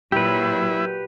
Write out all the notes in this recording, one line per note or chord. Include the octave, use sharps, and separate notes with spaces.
A#2 F#3 E4 G4 B4